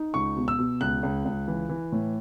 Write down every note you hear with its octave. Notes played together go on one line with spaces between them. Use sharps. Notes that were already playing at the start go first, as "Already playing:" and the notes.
Already playing: D#4
C#2 C#6
B2
E6
B2
C#2 F#6
C#2
C#2
E3
E3
A2